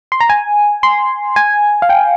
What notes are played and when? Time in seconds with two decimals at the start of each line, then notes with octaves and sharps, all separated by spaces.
0.12 C6
0.20 A#5
0.30 G#5
0.83 C6
1.36 G#5
1.82 F5
1.89 G5